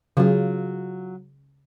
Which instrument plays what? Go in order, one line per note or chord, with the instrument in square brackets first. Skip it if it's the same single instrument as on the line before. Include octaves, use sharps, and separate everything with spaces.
[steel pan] C#3 [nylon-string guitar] F#3 F4